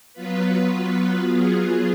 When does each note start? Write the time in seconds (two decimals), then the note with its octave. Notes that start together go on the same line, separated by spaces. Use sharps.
0.13 F#3 B3 F4 B4
1.23 F#3 B3 F4 G#4